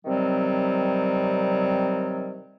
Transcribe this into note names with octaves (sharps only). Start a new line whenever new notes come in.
C3 D#3 F#3 G3 C4